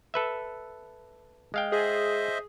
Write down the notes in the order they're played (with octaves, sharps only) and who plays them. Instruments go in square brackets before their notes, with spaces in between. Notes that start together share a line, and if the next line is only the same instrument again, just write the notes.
[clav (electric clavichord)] A4 B4 E5
G#3 F5 G5
[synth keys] G#4 [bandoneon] C5 D#5 E5